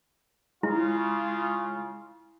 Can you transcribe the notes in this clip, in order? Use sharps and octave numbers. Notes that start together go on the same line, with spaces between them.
C#3 G#3 E4 F4